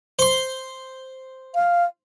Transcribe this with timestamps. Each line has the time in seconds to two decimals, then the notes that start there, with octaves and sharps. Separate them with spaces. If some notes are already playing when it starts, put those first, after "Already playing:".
0.19 C5 C6
1.54 F5